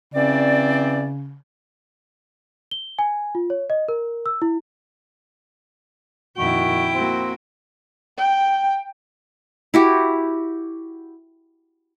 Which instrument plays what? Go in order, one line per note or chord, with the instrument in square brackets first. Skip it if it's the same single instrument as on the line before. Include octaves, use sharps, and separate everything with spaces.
[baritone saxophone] C#3 [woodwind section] E3 C4 D5
[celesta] G7
G#5
F4
C#5
D#5
A#4
E6
E4
[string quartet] F2 A#2 D#3 [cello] E4 G5 [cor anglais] F#4
[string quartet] A#3 F#4 [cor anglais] C4
[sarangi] G5
[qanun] E4 F#4 G4